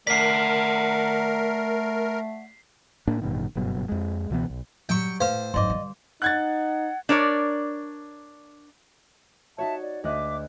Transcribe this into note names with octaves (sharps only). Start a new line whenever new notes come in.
A3 A#4 D5 F#5 B6 C7
A2 A#3 D4
A1 G2 B2 D#3
F#1 G2 B2 F#3
F2 G#3
C#2 B2 E3 B3
B1
F#3 G3 G5 C#6
A2 B4 C5 F5
G#1 F#2 D5 D#5 C6 D6
D3 G3
D#4 F#5 F#6 G#6 A6
D4 A#4 C#5 D5
D#4 F#4 C#5 E5 A5
D5
D2 D#5 E5 D6 F#6